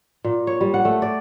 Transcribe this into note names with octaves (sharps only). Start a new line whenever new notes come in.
A#2
C#5
G3
F#5
A3
D5